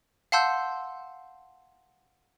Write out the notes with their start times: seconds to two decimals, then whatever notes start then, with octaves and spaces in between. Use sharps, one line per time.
0.32 F5 F#5 A5 C6 E6 G6